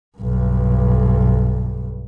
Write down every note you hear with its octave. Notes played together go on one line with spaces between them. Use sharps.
B1 G2